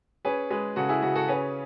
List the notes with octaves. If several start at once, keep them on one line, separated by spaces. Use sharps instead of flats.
C#4 G#4 B4
G#3 G#4 B4
C#3 F#4 A4
E4 G#4
C#3 F#4
F#4 A4
C#4 G#4 B4